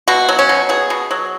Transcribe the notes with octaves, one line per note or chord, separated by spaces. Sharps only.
B2 F#4
F#3
C#4
B2
B3 G#4
B2
F#3